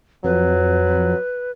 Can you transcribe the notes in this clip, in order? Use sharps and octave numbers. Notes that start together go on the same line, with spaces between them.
F2 F#3 B4